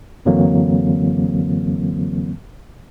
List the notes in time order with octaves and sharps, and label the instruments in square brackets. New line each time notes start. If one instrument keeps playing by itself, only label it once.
[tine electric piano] F#2 D3 E3 F#3 A#3 C4